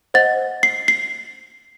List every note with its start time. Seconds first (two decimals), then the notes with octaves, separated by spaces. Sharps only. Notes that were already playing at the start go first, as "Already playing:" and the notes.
0.14 C5 D#5 F#5 A6
0.63 C7
0.88 C7